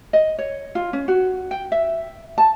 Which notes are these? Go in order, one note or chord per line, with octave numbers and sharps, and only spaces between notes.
D#5
C#5
F4
C#4
F#4
G5
E5
A5